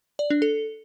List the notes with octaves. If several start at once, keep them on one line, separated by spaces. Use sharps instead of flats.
D5
D4
A4